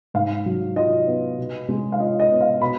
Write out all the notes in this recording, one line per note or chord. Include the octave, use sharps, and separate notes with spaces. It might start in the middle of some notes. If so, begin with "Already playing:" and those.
G#2 F5
F#3
F4 D#5
B3
B2
G#3
F5
F4 D#5
D#5
B3
F5
B2 B5